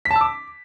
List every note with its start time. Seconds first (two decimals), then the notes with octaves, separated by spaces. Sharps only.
0.05 B6
0.11 A5
0.16 E6
0.21 D6